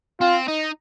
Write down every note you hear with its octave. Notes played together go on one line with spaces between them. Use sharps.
C4 F4
D#4